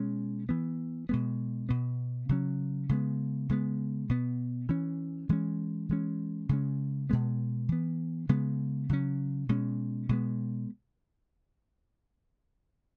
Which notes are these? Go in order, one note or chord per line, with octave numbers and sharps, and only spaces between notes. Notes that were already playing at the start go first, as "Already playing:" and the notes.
Already playing: B2 G#3 C#4
E3 B3
B2 G#3 B3
B2 B3
C#3 F#3 C#4
C#3 G#3 B3
C#3 G#3 B3
B2 B3
E3 C#4
E3 G#3 C#4
E3 G#3 C#4
C#3 G#3 C#4
B2 G#3 B3
E3 B3
C#3 G#3 B3
C#3 F#3 C#4
B2 G#3 C#4
B2 G#3 B3